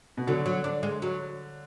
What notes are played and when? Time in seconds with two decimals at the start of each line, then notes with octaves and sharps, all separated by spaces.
0.17 B2
0.27 D3 F#3
0.46 F#3
0.64 D4
0.83 G#3
1.02 F#3